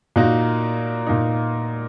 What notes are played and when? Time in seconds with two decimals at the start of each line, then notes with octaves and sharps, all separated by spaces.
0.16 A#2 A#3 D#4 F#4
1.06 A#2 A#3 D#4